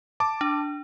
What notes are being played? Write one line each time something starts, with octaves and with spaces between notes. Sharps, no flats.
A5 D6
D4